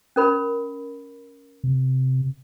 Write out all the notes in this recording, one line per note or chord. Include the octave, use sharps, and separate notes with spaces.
C#4 A#4 B5
C3